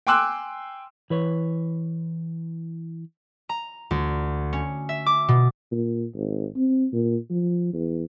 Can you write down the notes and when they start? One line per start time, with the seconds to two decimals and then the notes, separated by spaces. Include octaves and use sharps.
0.07 G5 G#5 C6 D6 E6 F#6
1.10 E3 B4 C#5
3.49 A#5
3.91 D2
4.53 C#4
4.89 E5
5.06 D6
5.28 B2
5.72 A#2
6.14 G#1
6.56 C4
6.93 A#2
7.30 F3
7.73 E2